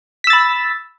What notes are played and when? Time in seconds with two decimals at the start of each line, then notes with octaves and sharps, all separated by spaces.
0.24 B6
0.27 E6
0.30 A6
0.33 B5